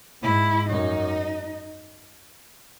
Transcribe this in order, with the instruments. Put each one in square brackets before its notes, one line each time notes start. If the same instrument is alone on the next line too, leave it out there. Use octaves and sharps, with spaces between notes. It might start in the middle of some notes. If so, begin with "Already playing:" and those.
[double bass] G#2 [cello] E4
[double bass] F#2 [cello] D#4